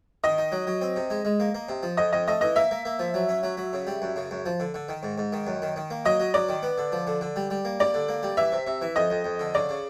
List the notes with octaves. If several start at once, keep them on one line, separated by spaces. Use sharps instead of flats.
D#3 D#5
D#4
F#3
F#3
C4
C3
G#3
G#3
A#3
A#3
C3
F3
F2 D#5
F2 D#5
A3 D#5
E3 D#5
A#3 E5
A#3
A#3
F3
F#3
C#4
F#3
F#3
C#3
G3
F#2
C#3
F#2
F3
D3
D3
D#3
G#2
G#2
D#3
F#2
D#3
D#3
A#3
F#3 D#5
F#3
F#3 D5
D#3
B3
D3
F3
D3
D3
G3
G3
A#3
G3 D5
D3
A#3
G3
E3 E5
C3
C3
E3
F2 D#5
F2
F2
D3
C#3 D5
C#3